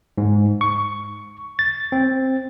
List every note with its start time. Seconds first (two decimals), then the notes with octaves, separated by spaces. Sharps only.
0.18 G#2
0.61 C#6
1.59 A6
1.92 C4